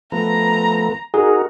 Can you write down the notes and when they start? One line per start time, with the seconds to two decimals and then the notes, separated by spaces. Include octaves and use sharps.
0.12 F3 A3 B3 A#5
1.14 D#4 F#4 G#4 A#4